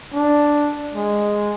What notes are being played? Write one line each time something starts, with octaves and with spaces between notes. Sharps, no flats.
D4
G#3